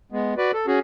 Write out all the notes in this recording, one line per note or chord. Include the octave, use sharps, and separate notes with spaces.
G#3 B3
F#4 B4 D5
A4
C#4 F#4 G#4